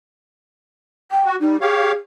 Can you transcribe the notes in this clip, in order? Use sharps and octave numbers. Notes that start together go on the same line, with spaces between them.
G5
F#4
G3 D#4
G4 G#4 C#5 F5